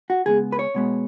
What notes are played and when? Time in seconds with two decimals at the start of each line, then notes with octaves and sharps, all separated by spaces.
0.10 F#4
0.26 C#3 G#3 B3 G#4
0.52 B4
0.59 C#5
0.75 B2 G#3 B3